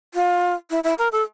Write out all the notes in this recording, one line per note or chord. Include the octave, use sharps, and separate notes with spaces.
F4
E4
E4
A#4
A4